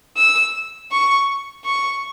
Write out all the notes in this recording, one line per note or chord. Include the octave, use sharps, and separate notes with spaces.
E6
C#6
C#6